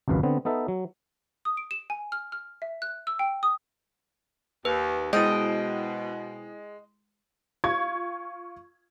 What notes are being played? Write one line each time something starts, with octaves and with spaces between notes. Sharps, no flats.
G#1 C#2 F#2 B4 F5
D3 B3 C4
B3 D#4 A4 E5
F#3
D#6
D7
E7
G#5
F6
F6
E5
F#6
E6
G5
D#6
D#2 B4
B2 G#3 E4 C5 D#5 G5
F4 C#6 G#6